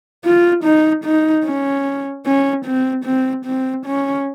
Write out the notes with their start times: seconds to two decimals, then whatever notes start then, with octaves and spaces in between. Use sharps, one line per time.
0.25 F4
0.64 D#4
1.04 D#4
1.45 C#4
2.26 C#4
2.65 C4
3.05 C4
3.46 C4
3.86 C#4